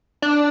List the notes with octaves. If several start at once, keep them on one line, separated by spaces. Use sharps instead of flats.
D4